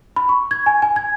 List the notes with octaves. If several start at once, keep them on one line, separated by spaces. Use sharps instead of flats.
B5
C#6
G#6
G#5
G#5
G#6